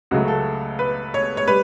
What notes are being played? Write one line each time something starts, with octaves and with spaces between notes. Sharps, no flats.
C#2 C#3 F#3 A3 F#4
A4
B4
C#5
C#5
G3 B4